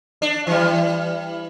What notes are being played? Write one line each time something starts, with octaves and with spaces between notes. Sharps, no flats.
D4
E3 G3